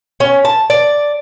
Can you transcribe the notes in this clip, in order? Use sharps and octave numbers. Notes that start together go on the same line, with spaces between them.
C#4
A5
D5